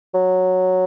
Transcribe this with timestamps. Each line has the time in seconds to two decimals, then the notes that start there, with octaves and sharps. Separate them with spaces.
0.14 F#3